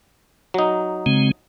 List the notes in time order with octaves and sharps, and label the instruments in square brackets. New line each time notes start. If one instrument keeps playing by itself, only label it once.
[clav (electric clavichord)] F#3 D#4
[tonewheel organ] C#3 G#3 C4